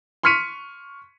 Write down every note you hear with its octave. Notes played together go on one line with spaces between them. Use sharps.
C6 C#6 F6 B6 C#7 D#7